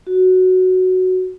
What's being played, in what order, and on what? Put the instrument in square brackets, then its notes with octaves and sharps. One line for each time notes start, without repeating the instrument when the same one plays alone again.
[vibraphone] F#4